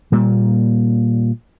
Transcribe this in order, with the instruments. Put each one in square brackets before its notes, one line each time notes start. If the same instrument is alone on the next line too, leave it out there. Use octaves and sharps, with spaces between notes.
[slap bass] A#2 G3 A#3